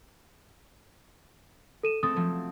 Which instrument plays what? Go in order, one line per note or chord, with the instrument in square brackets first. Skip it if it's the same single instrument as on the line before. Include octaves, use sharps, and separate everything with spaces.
[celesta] A4 D#7 E7
[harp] A3 C4 A4 [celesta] D#6
[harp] F3 F#3 A3